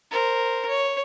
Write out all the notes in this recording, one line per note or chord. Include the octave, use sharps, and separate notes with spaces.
A#4 C5
C#5